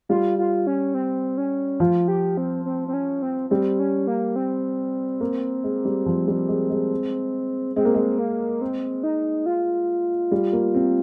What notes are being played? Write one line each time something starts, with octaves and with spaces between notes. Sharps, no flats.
G3 F4
F4
C#4
C4
C#4
F3 F4
G4
C4
C4
C4
C#4
C4
G3 C4
C#4
A#3
C4
A#3
G#3
G3
F3
G3
G#3
G#3
G#3 C4
A#3
G#3
A#3
C4
D#4
F4
G3
A#3
C4